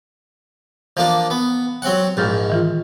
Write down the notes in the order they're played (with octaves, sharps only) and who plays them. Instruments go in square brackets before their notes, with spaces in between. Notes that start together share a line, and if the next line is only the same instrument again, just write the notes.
[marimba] E3 [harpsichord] F3 A#3 D4
[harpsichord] B3
F#3 C4 F#5
[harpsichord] A#1 G#2 [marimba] F6 G6 A6
[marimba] D#3 E3 F4